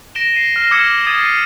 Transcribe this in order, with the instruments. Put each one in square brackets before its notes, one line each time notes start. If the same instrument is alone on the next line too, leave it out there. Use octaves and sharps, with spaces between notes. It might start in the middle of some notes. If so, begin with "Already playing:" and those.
[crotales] A#6 D7 E7 G7
C7 D#7
F6 A#6 C7 E7
D6 E6 F6 G#6 C#7 E7
D#6 G#6 A6 D#7
C7 D#7